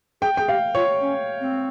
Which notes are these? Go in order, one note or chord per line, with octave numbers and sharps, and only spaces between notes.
G#4 G5
G#4 G5
G4 F5
F4 C#5
C#4
C4